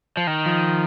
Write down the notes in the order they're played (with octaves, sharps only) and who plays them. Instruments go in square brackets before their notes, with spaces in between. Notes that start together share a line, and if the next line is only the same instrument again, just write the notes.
[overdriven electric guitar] F3
D#3
[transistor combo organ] F3